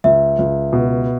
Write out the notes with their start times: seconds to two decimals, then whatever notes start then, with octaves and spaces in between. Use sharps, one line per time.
0.04 C#2 E5
0.39 C#2
0.73 B2